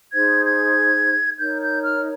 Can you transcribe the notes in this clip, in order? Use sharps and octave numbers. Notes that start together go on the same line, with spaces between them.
D#4 G#4 C5 G#6
G#6
D#4 A#4 C#5 G6
G6
F6